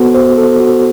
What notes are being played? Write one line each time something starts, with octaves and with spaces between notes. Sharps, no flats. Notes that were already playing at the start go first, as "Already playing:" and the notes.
Already playing: B3 F#4 A4 C5
C5
A4
F#4